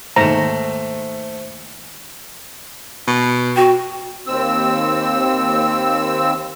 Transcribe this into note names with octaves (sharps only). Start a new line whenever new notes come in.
D#2 G#2 A3 C5 A#5 E7
B2
F#4 G5
D#2 C4 E6